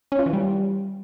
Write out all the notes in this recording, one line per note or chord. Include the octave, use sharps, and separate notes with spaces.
C#4
F4
E3
G3